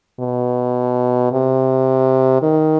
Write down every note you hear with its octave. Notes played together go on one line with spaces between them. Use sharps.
B2
C3
D#3